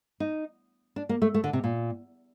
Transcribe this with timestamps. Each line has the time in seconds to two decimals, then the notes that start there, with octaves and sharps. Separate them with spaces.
0.20 D#4
0.96 D4
1.09 A#3
1.22 A3
1.34 A3
1.44 D3
1.53 C3
1.64 A#2